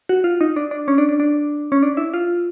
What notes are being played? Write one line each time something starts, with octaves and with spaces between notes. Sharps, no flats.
F#4
F4
D#4
D4
D4
C#4
D4
D4
D4
C#4
D4
E4
F4